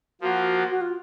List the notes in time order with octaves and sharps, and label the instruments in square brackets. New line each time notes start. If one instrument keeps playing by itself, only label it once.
[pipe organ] F3 A#3 F4 [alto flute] F#4
[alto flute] F#4
F4